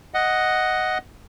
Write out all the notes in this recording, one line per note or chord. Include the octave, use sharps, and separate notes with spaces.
D#5 F#5